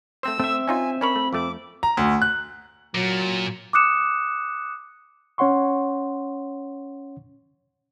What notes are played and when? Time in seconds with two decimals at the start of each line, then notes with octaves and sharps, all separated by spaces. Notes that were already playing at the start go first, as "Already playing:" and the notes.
0.23 A3 C4 C5 E6
0.40 A3 C4 E5
0.67 C#4 D#4 F4 G#5
1.01 C#4 A#4 C#5 B5
1.16 A3
1.33 F2 A3 D6
1.83 A#5
1.97 D2
2.22 F#6
2.95 A#2 F#3
3.73 D6 D#6 F#6 C#7 E7
5.38 C#4 C#5 F#5 C6 C#6